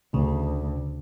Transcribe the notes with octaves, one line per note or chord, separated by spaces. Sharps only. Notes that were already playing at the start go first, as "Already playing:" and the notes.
D2 C#3